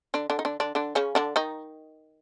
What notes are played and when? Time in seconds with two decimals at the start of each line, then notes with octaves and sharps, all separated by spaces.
0.14 D3 D4
0.30 D3 D4
0.39 D#4
0.45 D3 D4
0.60 D3 D4
0.75 D3 D4
0.95 C#3 C#4
1.15 D3 D4
1.36 D#3 D#4